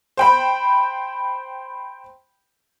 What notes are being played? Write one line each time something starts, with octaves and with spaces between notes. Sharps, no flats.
C5 G5 B5